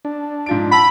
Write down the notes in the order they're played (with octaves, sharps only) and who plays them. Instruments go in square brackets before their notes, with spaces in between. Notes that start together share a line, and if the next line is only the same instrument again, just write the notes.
[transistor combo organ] D4
[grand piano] G#2 F3 D7
[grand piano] F#5 A5 E6 [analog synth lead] B5